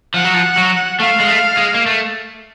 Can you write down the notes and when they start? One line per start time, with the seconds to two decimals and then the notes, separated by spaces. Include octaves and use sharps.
0.14 F3 F#5
0.24 F#3
0.34 F3
0.57 F#3
1.00 A3 F5
1.20 G#3
1.28 A3
1.57 G#3
1.74 A#3
1.86 A3